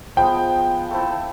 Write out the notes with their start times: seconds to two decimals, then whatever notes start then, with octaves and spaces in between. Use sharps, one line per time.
0.16 F3 G#3 B3 G5
0.91 A3 C4 E4 A4